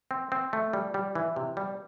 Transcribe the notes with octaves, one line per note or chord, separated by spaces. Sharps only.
C4
C4
A3
G3
G3
E3
C3
G3